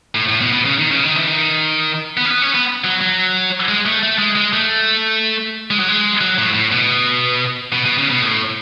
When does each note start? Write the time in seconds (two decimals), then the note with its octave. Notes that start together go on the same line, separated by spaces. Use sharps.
0.15 A2
0.28 A2
0.41 B2
0.53 B2
0.65 C#3
0.78 D#3
0.91 C#3
1.03 D#3
1.16 E3
1.27 D#3
2.17 B3
2.25 C#4
2.30 B3
2.42 C#4
2.55 B3
2.84 F#3
3.01 F#3
3.68 G#3
3.86 A3
4.03 A3
4.18 G#3
4.36 G#3
4.53 A3
5.70 G#3
5.80 F#3
5.88 G#3
6.21 F#3
6.38 A2
6.54 A2
6.72 B2
7.72 B2
7.86 B2
7.98 C#3
8.10 B2
8.22 A2